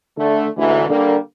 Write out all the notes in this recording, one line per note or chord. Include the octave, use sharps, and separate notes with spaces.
D3 A3
D2 G#2 E3
D3 G3 A#3